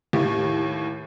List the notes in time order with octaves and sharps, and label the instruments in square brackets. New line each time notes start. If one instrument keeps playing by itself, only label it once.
[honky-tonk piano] D#2 A2 [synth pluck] E4 G4